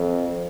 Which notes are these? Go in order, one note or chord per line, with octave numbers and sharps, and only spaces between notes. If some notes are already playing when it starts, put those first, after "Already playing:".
Already playing: F2